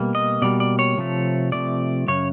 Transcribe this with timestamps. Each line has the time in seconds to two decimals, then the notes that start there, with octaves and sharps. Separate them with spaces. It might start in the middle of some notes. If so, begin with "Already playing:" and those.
Already playing: B2 G3 A#3
0.15 D#5
0.42 B2 G3 A#3 D5
0.60 D5
0.79 C#5
0.98 C3 F3 A3
1.52 C3 F3 A3 D5
2.08 F#2 C#3 C#5